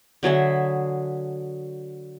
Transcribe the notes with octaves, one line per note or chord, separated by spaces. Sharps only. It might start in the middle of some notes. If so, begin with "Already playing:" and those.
D3 F#3 G#4 E5